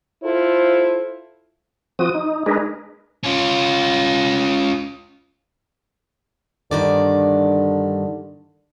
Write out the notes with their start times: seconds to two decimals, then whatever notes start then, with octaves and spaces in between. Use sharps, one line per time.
0.23 E4 F4 A4 C5
1.99 F3 C4 F#4 D#6
2.15 D#4
2.46 G#3 D4 D#4 G#4 A#4 B4
3.24 C#4 F4
6.71 G2 D3 D#3 D5